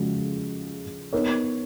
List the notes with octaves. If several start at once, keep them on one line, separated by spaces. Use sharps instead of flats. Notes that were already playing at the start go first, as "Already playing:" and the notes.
Already playing: C#3 F3 G#3 C#4 F#4
B3 D#4 A#4 C#5